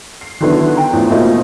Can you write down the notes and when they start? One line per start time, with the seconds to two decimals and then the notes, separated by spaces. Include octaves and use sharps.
0.21 C7
0.41 D3 D#3 F#3 B3 D4 E4
0.77 G5 A#5
0.93 E2 A2 F3
1.11 B2 A3 A#3 C4 D#4 F4